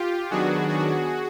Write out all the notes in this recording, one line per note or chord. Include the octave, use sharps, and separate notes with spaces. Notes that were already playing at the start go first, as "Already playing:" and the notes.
Already playing: F4 G4
D#3 F#3 B3 D4 F#4 G#4
F#4 G#4